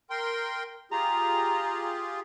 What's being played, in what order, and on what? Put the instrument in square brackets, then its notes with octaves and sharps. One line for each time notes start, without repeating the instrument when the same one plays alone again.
[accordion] A#4 G5 C6
[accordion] F4 G4 G#4 [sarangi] A#5